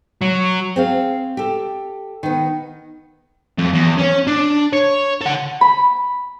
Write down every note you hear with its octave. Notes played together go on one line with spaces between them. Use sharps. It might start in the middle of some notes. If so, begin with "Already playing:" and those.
F#3
C4 G#4 F5
G4 A4
D#3 B3
F2
E2
C#4 C#5
D4
C#5
A4 F#5
B5